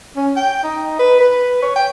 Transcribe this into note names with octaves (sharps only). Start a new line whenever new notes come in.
C#4
G5
D#4
B4
B4
C#5
G5